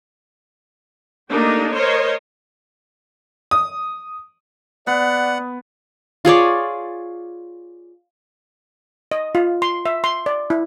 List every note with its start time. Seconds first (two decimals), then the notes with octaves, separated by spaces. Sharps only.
1.30 A3 A#3 D4 D#4 G4
1.73 A#4 C5 C#5 D#5
3.51 D#6
4.87 B3 D5 F#5
6.25 F4 G#4 C#5 D5
9.12 D#5
9.35 F4
9.62 C6
9.86 E5
10.04 C6
10.26 D5
10.50 E4